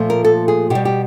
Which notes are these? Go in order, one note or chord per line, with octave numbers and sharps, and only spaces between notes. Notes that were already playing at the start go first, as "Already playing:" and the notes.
Already playing: A#2 F3 A3
A#4
A4
G#4
B2 G3 G4
G4